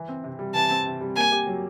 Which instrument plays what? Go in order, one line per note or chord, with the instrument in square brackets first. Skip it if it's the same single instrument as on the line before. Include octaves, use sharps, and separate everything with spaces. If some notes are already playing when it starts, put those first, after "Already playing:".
Already playing: [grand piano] E3
C4
C3
G3
[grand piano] E3 [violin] A5
[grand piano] C4
C3
G3
[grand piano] A#3 [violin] G#5
[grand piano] G4
F#3